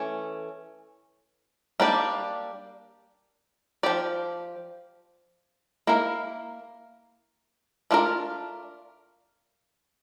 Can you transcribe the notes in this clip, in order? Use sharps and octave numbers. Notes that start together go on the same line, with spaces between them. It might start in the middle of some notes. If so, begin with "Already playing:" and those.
Already playing: E3 A3 C#4
G3 A#3 D4 G4 D5
F3 C#4 G4 D5
A#3 E4 A#4
A3 D4 F4 A#4